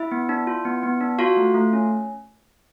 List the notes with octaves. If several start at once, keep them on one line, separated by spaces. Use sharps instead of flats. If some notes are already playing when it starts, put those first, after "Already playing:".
Already playing: E4 E5
B3
D4
F4
B3
B3
D4
F4 F#4 F5
A3
A3
C#4